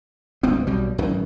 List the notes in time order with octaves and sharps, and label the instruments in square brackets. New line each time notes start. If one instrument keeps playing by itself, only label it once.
[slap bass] G1 C#2 B3 C4
B1 B2 G3
G#1 F#2 D#3 E3